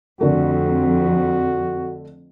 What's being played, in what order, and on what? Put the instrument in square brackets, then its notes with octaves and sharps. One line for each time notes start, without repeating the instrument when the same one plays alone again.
[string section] F2 [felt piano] D3 A3 [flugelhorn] F#4